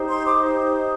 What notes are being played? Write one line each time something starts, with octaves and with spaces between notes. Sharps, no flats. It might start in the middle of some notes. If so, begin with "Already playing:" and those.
Already playing: D#4 G4 C5
C6
D6